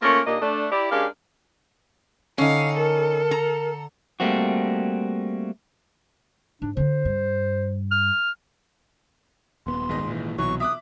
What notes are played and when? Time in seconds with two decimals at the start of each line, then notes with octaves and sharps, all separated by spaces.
0.03 A3 A#3 C#4 F4 A#4
0.27 D#2 A#2 A#3 D4 D#5
0.42 A3 D4
0.72 E4 G4 D5
0.92 G#3 C#4 D4 G4 A#4 F5
2.38 D3 C#4 D#4 F5
2.77 A4 A#4
3.31 A#5
4.20 G3 A3 A#3 C4 F#4
6.62 G#2 D4
6.77 D3 D4 C5
7.05 G2
7.92 F6
9.67 D#1 B3 C6
9.89 G#1 G#3 D#5
10.07 A#2 E3
10.38 C2 B2 E3 F#3 C#6
10.60 E5 D6 D#6 F#6